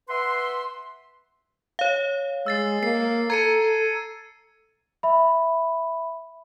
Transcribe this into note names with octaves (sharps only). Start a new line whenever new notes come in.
B4 E5 F#5 C6
C#5 F5
G#3 E6 A6 C7
A#3 C7
A4 A#5 G#6 C#7 D#7
E5 B5